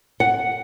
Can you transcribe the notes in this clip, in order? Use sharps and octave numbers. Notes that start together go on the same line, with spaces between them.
F#5